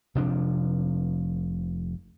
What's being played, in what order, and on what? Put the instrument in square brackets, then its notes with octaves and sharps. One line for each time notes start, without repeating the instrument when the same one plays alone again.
[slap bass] F1 C3 F3 D4